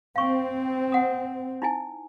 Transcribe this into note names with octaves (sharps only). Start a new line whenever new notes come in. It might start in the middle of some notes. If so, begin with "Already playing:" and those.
C4 F5 C#6
F#5 D#6
D#4 E4 G#5